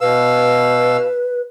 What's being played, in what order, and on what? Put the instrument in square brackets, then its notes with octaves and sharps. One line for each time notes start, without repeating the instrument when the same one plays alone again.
[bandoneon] B2 F5 E6 [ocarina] B4